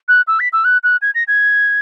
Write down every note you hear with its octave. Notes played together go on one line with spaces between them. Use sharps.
F#6
E6
B6
E6
F#6
F#6
G#6
A#6
G#6